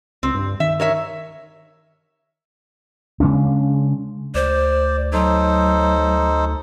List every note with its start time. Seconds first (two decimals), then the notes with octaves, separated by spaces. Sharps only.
0.23 C#2 C4
0.35 G2
0.60 D#3 E5
0.80 A#4 C#5 E5
3.20 C#3 G#3 C#4 D4
4.35 D2 C5 D5
5.13 F#3 D#4 A4 C5